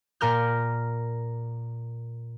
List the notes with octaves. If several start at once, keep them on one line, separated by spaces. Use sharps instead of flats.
A#2 A#4 F6 G6